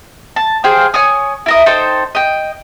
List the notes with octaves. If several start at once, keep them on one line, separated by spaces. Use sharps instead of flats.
A5
G#4 C5 F5 G5
C#5 G#5 C#6 D#6
E4 A#4 D#5
D#4 A4 C5 G5
D#5 G5